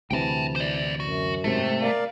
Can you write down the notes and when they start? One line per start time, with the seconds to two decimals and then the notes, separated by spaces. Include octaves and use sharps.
0.11 D2 C3 E3 G5 A5
0.56 C5 D5
1.00 F#2 F#4
1.44 G#2 C3 A3
1.82 A#4 D5 F5